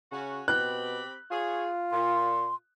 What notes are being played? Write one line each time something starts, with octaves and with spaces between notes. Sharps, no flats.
C#3 C#4 F#4
B2 C4 G4 B5 F#6
F4 G#4 C#5
A#2 C6